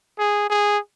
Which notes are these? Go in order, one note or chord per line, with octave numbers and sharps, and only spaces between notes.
G#4
G#4